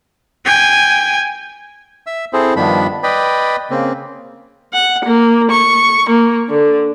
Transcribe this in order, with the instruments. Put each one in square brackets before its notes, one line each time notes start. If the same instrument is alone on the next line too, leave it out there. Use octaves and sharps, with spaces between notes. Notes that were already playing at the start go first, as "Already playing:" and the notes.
[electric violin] G5 G#5
[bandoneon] E5 E6
C4 E4 G#4 A4 C5
G2 D#3 F3 B3 D4 B5
B4 D5 D#5 G5 B5
C#3 A#3 C4
[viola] F#5
A#3
C#6
A#3
D3